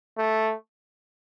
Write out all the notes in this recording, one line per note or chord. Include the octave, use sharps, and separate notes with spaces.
A3